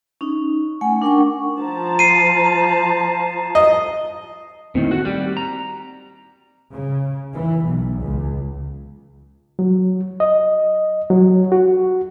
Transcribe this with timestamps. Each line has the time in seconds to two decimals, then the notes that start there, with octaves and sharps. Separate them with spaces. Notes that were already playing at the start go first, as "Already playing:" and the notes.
0.21 C#4 D#4
0.81 A3 F#5 G#5
1.02 D4 A#4 F#5 G5 C#6
1.59 F3 A5 A#5
1.99 C7 D#7
3.55 D#5
4.75 A2 D#3 A#3 C4
4.91 F#4
5.05 G3
5.37 A#5
6.71 C#3
7.34 E3
7.66 B1
8.03 C#2
9.59 F#3
10.20 D#5
11.10 F#3
11.52 F#4